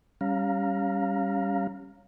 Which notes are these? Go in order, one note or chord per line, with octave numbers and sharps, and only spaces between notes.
G3 C#4 F5 A#5